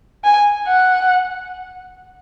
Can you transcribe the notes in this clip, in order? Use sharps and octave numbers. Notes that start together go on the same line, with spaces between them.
G#5
F#5